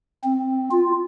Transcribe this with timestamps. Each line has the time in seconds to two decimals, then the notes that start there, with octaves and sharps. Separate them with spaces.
0.24 C4
0.71 F4